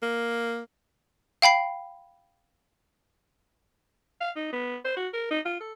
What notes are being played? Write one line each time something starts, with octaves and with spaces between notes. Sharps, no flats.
A#3
F5 G5 B5 C7
F5
D#4
B3
C5
F#4
A#4
D#4
F4
A4